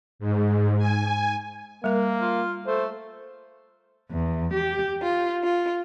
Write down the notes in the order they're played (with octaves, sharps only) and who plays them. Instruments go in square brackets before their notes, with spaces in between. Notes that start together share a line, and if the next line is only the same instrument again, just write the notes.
[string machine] G#2
G#5
[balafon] G3 A#4 [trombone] A#3
[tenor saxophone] F4
[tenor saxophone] A3 [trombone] C5
[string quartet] E2
G4
F4
F4